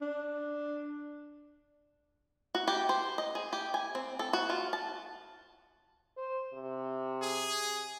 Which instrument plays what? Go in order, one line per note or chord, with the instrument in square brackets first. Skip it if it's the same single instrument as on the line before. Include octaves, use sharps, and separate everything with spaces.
[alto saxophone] D4
[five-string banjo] F#4
G4
C5
D#5
G#4
G4
G#5
C4
A4
F#4
F4
A5
[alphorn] C5
C3
[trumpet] G#4